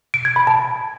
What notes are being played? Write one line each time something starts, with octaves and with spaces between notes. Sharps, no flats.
D7
G#6
B5
A5